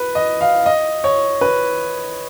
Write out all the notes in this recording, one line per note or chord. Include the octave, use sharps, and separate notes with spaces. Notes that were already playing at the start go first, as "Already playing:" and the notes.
Already playing: B4
D#5
F5
D#5
C#5
B4